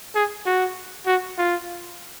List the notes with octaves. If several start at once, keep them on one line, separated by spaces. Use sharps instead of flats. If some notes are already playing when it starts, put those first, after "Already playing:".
G#4
F#4
F#4
F4